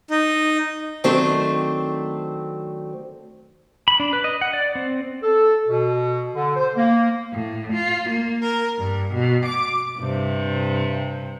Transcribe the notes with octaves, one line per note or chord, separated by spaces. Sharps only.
D#4
D#3 F#3 A3 C4 D4 C5
B5
D4
B4
D#5
F#5
D5
C4
A4
B2
D3
C5
A#3
A2
F4
A#3
A#4
G2
B2
D6
G2 C3